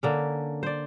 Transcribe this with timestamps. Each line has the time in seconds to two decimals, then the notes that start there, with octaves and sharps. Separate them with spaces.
0.03 D3 A#3 C#4
0.63 C5 D5